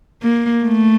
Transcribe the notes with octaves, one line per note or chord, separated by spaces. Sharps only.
A#3
A3